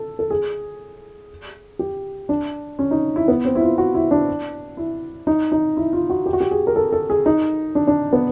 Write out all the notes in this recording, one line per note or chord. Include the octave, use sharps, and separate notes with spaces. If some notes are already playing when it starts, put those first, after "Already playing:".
Already playing: A4
A4
G#4
G4
D4
C#4
D#4
E4
B3
C4
E4
F4
F#4
E4
D4
E4
D#4
D#4
E4
F4
F#4
G4
F#4
G4
G#4
A#4
A4
A4
G#4
D#4
D4
D4
B3